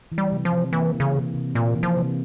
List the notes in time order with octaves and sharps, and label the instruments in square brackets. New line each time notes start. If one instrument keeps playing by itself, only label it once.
[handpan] E3
[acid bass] G3
[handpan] C3
[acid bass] F3
[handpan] C3
[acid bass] E3 [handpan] A#3
[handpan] E3
[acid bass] C#3
[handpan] C3
C3
[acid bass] A#2 [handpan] A#3
[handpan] E3
[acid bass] F3
[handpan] C3